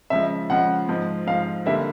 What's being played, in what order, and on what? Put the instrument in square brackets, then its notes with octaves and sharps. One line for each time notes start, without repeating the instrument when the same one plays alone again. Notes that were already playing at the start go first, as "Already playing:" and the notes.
[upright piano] C#3 F3 G#3 [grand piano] E5
[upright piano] C#3 F3 G#3 [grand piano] F#5
[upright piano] G#2 F3 G#3
[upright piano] G#2 F3 G#3 [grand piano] F5
[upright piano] D3 G3 A#3 [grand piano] E5